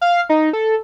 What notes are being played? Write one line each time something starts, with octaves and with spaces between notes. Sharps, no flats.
F5
D#4
A4